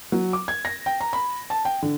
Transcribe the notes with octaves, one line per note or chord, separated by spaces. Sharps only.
F#3
D6
G#6
A#6
G5
A#5
B5
A5
G5
D3